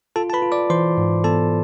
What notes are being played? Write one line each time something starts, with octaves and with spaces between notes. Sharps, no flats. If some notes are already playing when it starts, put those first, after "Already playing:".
F4 A4 A5
A5
B4 B5
F4
D5 D6
E3 C5 C6
G#2
B3 A4 A5